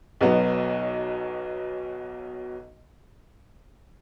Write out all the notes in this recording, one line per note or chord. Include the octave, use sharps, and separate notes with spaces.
B1 B2 F#3 B3